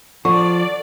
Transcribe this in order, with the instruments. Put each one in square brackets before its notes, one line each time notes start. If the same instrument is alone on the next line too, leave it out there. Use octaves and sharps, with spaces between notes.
[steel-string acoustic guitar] D3 [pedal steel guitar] F3 [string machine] D5 [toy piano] C#6